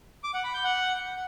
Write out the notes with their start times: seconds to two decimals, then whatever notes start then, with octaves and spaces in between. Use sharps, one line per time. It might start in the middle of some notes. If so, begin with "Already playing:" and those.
0.24 D6
0.34 F#5
0.44 B5
0.54 G6
0.64 F#5